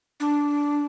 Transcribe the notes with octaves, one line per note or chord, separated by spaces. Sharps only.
D4